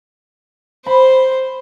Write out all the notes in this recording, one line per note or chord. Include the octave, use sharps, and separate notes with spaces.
C5 B5